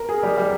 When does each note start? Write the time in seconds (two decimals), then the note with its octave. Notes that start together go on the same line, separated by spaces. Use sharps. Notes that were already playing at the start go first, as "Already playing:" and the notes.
Already playing: A#4
0.09 G#4
0.23 G3
0.37 G3